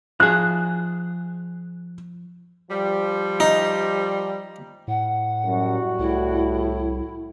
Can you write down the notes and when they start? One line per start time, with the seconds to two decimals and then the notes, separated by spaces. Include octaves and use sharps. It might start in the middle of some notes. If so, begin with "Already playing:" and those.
0.20 F3 G#4 F#6
2.70 F3 G3
3.40 D#4
4.88 A2 F#5
5.46 F#2 G3 F#4
5.99 C2 A2 E4